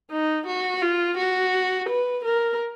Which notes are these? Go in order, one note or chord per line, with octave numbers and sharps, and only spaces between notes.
D#4
F#4
F4
F#4
B4
A#4